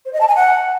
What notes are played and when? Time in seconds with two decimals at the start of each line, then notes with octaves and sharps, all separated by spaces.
0.06 C5
0.13 D#5
0.21 A5
0.28 G#5
0.36 F#5